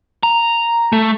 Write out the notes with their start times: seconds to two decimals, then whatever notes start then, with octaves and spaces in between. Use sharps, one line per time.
0.23 A#5
0.92 A3